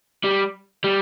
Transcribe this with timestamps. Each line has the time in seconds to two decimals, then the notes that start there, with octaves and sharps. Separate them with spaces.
0.24 G3
0.84 G3